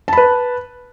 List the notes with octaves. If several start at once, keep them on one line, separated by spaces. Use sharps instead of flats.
B4 A5 B5